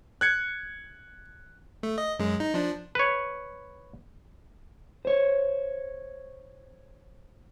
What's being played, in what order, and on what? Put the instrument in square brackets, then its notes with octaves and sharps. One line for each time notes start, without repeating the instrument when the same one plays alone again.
[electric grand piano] F#6 G#6 C#7
[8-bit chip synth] A3
D#5
F#2 G#3
D#4
F3 D4
[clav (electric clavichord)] B4 C#5
[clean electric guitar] C5 C#5